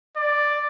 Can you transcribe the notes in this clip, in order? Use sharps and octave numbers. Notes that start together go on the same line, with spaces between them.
D5